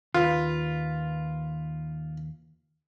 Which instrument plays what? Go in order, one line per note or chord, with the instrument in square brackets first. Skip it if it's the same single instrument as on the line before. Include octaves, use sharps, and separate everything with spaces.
[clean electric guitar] D#2 B4 [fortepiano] F4